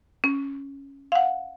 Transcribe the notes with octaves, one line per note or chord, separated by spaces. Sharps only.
C#4
F5 F#5